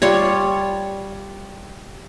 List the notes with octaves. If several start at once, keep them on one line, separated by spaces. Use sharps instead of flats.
G3 F4 C#5